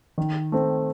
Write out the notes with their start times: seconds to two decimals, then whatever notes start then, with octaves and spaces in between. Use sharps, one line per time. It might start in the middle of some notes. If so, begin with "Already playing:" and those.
0.18 D#3
0.52 A3 C4